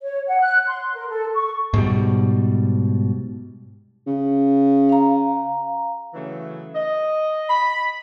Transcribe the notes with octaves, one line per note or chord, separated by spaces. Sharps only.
C#5
F#5
F#6
C6
A#4
A4
C#6
G#2 B2 G3
C#3
F5 A#5
C#3 E3 F#3 A3 C#4
D#5
B5